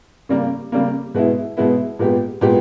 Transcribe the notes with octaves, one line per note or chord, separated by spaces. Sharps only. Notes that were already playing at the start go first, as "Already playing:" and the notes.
C#3 G3 A#3
C#3 G3 A#3
B2 G#3 B3 E4
B2 G#3 B3 E4
A#2 G#3 B3 G4
A#2 G#3 B3 G4